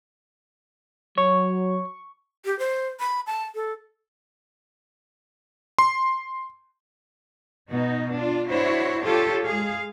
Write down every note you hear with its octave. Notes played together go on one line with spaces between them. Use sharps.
F#3 C#5 C#6
G4
C5
B5
A5
A4
C6
B2 D#4 F#4
D4 F4
D4 E4 F#4 C5 C#5
F4 G4 A4 C#5
G#3 G#4 F5